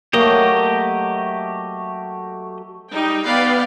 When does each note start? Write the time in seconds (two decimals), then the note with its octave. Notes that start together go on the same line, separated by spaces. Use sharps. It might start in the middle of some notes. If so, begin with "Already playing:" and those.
0.13 F#3 A3 A#3 G4 D#5
2.91 G3 D#4 G5
3.25 B3 B4 D5 F5 G5